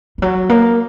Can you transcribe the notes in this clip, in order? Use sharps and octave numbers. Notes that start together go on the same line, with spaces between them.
E3
F#3
A#3